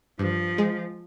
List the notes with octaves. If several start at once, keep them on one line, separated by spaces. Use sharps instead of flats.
G2 F3
G#3